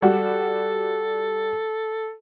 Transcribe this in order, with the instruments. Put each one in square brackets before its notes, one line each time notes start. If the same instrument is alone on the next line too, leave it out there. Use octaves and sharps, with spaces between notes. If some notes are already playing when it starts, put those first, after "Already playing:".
[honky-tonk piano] G3 F#4 [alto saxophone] A4